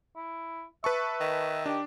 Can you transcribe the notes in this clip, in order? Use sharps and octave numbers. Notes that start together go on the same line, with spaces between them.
E4
B4 E5 A5 C#6
D#3
D4 G4